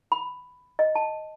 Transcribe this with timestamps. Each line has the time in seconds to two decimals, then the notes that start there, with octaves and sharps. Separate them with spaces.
0.12 B5
0.79 D#5
0.95 A5